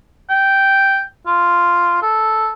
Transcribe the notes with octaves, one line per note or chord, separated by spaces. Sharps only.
G5
F4
A4